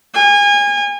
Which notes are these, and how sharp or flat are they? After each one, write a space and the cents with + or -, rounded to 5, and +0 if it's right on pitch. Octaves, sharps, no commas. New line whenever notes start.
G#5 -30